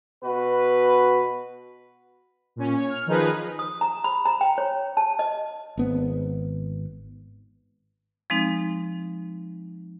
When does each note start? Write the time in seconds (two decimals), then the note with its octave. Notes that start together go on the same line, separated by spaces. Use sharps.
0.23 B2 F#4 B4
2.56 A#2 C#4
2.75 C#5
2.90 F6
3.06 D#3 F3 D#4 G#4 B4
3.59 D#6
3.81 A#5
4.04 B5
4.25 A#5
4.41 G5
4.58 C#5
4.97 A5
5.19 D#5
5.77 G#1 B3 C4
8.30 F3 G#3 C4 D#4